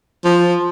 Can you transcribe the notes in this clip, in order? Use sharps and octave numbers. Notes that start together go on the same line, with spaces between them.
F3